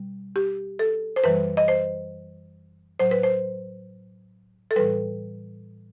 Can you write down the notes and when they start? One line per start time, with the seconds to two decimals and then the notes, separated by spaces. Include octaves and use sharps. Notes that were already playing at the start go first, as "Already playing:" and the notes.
Already playing: B2 G3
0.36 G4
0.79 A4
1.16 C5
1.24 F#2 E3 G3 B4
1.57 D#5
1.68 C5
3.00 A2 F#3 C5
3.11 B4
3.23 C5
4.71 A4
4.76 A2 E3 G3 B4